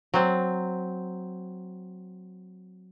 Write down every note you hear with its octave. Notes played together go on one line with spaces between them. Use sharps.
F#3 C4